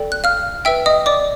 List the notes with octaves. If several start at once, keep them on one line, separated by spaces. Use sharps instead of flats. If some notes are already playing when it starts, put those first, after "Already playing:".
Already playing: A4 D5 G5
F#6
F5 F6
B4 E5 G5 E6
D#5 D#6
D5 D6